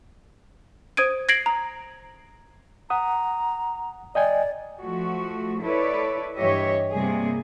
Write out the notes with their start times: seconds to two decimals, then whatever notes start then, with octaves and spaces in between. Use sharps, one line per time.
0.97 C5 D#6 G#6 D7 D#7
1.29 G#6 A#6 C7 D7 F#7
1.46 A#5
2.90 F#5 A#5 D#6
4.15 D5 D#5 G5 G#5
4.79 F3 A3 F#4
5.61 E4 A4 B4 C#5 D5
6.37 G2 E3 G4 C#5 D#5 E5
6.91 C3 G3 A#3 G#4